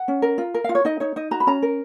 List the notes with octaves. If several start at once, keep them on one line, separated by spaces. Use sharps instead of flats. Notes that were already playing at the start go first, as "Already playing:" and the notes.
Already playing: F#5
C#4
A#4
F4
A#4
F5
F4
C#5
D#4 D#5
D#4 C#5
D#4 D#5
F#4 A#5
B5
C#4 A#5
A#4